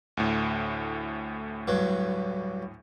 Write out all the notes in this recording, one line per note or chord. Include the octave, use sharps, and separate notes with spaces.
D2 A2
G2 F#3